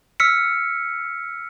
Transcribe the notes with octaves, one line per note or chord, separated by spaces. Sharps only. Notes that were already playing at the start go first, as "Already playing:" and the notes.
E6 F6 B6 C#7